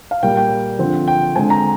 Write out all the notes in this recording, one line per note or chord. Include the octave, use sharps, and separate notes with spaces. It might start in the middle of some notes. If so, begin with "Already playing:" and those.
F5
A#2 G3 A#3 G5
G5
D3 F3 C4
G5
D3 G#3 C4 G#5
A#5